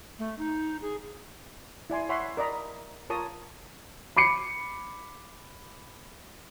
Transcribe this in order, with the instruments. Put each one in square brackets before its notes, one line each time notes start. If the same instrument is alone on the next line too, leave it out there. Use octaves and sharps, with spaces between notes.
[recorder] A3
D#4
G#4
[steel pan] E4 D5 G#5 C6
C#5 E5 F#5 B5 C6
A#4 D5 D#5 A#5 B5
F4 A#4 C#5 A5 A#5 D#6
[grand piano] B5 D6 C7 C#7